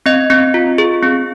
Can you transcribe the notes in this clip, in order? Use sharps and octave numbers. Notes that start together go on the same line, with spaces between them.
C4 D#5
C4
F4
G#4
C4